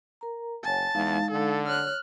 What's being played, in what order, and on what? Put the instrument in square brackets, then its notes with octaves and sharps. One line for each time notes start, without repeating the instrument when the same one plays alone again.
[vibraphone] A#4 A#5
[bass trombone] F#1 [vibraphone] C#5 F#5 G#5 [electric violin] A5
[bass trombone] E2 [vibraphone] G#3 D#4 F5
[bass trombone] D3 [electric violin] A4
[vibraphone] C#5 [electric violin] F6 F#6